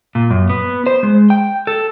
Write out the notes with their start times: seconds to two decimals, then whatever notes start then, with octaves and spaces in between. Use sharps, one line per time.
0.15 A#2
0.31 F#2
0.50 B3
0.86 C5
1.03 G#3
1.30 G5
1.67 A4